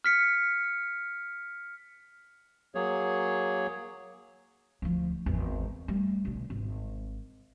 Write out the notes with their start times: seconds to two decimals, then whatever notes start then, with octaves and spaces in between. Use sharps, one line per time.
0.04 F6 B6 C#7
2.75 F#3 A#3 G#4 C#5
4.82 D2 F3
5.26 G#1 E2
5.88 G3 A3
6.25 B1 D3
6.50 G#1